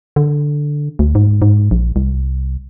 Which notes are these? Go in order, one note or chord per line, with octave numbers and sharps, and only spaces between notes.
D3
D2
G#2
G#2
A#1
C2